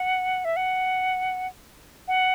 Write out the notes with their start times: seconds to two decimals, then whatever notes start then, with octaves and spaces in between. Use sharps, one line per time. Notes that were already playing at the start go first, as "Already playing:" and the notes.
Already playing: F#5
0.45 E5
0.56 F#5
2.08 F#5